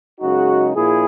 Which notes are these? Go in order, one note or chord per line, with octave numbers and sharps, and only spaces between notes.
F#2 C#3 G#3 D#4 F#4
A#1 A#2 E4 G#4